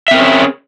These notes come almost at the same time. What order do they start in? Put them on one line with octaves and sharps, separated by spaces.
E5 C4 A#4 C#4 G#4